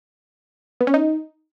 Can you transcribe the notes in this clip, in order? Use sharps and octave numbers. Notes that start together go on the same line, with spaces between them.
B3
C#4
D#4